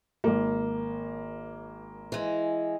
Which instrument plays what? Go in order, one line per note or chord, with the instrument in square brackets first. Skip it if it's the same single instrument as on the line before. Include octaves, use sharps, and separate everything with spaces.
[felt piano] G#1 A#3
[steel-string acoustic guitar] E3 G#3